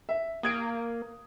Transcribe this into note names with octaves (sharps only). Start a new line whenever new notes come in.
E5
A#3 D#6 G#6 D7